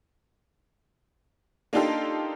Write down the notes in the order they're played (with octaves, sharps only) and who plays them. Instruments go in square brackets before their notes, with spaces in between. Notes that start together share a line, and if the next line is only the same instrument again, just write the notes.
[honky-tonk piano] A#3 D4 D#4 F4 G4 A4